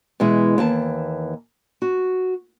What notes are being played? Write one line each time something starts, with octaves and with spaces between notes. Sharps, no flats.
B2 E3 G#3 E4
D#2 E3 A5
F#4